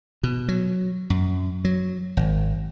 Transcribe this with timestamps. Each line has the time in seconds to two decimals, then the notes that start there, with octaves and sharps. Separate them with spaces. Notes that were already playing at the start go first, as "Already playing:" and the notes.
0.23 B2
0.48 F#3
1.10 F#2
1.65 F#3
2.17 G#1